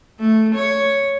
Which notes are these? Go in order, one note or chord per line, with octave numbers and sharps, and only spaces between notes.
A3
C#5